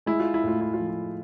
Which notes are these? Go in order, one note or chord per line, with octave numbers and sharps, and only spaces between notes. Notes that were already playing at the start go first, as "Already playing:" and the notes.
G#3 E4
F4
E4
A2 F4
E4
F4
F3
E4